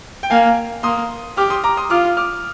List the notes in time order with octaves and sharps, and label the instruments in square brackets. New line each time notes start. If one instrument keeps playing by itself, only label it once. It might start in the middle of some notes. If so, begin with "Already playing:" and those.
[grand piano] G5
[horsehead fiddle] A#3 [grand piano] F5 G#5
[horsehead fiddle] A#3 [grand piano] C6 D#6
[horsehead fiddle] G4 [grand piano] D6 F6
[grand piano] C6 D#6
A#5 D6
C6 D#6
[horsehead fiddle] F4 [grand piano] D6 F6
[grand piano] D6 F6